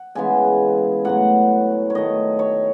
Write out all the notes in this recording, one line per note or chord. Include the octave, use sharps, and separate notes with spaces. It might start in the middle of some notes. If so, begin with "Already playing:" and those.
Already playing: F#5
C#3 E3 G#3 B3 G#5
A2 F#3 B3 F#5
C#5
D#3 A3 D#5
C#5